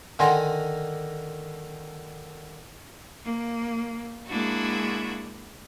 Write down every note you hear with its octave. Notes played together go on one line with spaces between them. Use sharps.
D3 D#3 F#5 G#5 A#5 C6
A#3
G#3 A#3 D4 E4 F#4